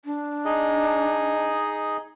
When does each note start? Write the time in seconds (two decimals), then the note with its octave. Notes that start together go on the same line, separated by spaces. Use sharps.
0.05 D4
0.45 D#4 G#4 D#5